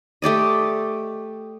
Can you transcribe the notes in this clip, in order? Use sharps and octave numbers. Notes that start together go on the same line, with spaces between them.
A3 G4 D5 D#5